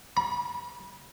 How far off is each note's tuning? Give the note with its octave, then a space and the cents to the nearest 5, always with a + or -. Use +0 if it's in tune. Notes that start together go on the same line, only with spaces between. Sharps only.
B5 -45